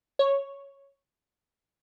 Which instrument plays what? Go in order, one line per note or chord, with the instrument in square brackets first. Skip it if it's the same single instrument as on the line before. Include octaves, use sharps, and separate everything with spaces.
[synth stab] C#5